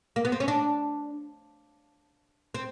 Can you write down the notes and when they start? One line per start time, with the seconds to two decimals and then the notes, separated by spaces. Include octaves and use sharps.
0.16 A#3
0.25 B3
0.32 C4
0.40 C#4
0.48 D4
2.54 C4